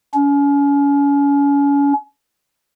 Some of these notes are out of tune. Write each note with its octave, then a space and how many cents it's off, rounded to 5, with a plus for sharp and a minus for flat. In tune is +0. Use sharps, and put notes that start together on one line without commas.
C#4 +35